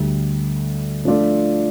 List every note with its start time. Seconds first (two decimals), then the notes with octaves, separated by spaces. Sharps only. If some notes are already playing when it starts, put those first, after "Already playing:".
Already playing: D2 D3 G3
1.05 F3 A3 D4 F4